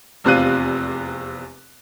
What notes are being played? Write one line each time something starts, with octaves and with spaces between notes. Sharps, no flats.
F1 E2 C3 F4 F#6 D#7